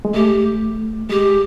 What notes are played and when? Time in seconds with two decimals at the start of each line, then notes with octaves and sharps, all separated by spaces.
0.05 G#3
0.14 A3 G4
1.09 G#3 G4